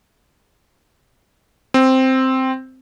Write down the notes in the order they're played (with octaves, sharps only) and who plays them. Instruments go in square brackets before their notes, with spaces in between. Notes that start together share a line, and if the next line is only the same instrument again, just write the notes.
[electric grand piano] C4